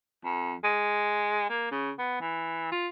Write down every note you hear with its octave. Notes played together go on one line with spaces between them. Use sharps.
F2
G#3
A#3
C#3
B3
E3
F4